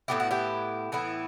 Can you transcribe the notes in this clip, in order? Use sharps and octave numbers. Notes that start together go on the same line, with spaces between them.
A2 E3 B3 E4 G4
F#4
E4 G4
A2 E3 B3 E4